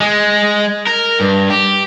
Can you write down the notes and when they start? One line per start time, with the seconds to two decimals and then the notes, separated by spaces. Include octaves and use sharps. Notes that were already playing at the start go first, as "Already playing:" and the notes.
0.01 G#3
0.87 A#4
1.20 G2
1.50 G4